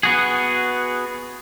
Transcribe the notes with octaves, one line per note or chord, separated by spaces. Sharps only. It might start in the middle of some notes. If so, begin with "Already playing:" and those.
B3 F#4 G#4